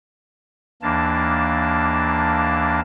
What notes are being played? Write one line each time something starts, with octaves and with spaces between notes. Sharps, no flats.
D#2 E3 A#3 D4 A5